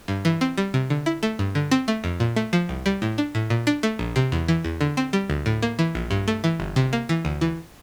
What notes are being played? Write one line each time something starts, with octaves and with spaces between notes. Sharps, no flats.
G2
E3
C4
G3
C3
D3
E4
A3
G2
D3
C4
A3
F2
A#2
A3
F3
C2
G3
A2
D4
A2
A#2
D4
A3
A#1
C3
E2
E3
E2
D3
C4
G3
D2
A2
A#3
E3
A#1
G2
A3
E3
G1
C3
A#3
E3
D2
E3